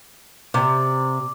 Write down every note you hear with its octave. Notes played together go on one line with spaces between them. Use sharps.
C3 D5